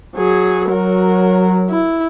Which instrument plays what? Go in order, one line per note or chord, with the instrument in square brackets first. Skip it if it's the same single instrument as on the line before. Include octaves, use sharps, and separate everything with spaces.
[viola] F#3 G#4
[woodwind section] F#3 [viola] F#4 A#4
[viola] E4